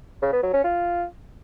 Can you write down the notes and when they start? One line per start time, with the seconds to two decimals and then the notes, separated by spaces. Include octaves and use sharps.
0.22 C#3
0.33 B3
0.43 F#3
0.54 C#4
0.64 F4